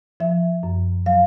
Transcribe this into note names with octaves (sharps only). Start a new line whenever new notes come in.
F3 E5
F#2
F#3 F5